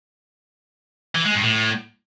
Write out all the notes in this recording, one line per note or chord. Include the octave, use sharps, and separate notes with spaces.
E3
G#3
G2
A2